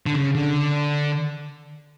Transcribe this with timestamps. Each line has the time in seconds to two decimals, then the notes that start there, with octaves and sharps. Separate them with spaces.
0.06 D3
0.14 C#3
0.35 D3